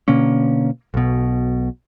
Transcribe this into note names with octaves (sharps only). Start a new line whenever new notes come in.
B2 D3 A#3 C#4
B1 B2